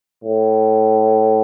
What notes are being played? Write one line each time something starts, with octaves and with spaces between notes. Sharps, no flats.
A2